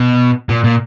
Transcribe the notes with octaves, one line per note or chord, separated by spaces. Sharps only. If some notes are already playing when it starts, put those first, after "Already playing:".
Already playing: B2
A#2
A#2